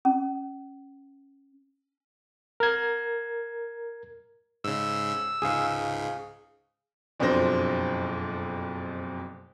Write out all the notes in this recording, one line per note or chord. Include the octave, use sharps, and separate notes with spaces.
C#4
A#4 G#6
G#2 C#3 E6
C#2 G#2 G#4 F5
F#1 F2 B2 D4 C5 A#6